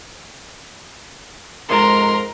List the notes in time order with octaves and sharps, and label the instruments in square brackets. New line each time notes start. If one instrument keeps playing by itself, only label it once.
[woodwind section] F2 G#2 G#3 [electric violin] A#4 A#5 [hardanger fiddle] C6